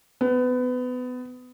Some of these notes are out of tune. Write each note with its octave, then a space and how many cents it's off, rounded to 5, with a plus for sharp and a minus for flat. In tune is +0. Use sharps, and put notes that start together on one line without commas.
B3 +25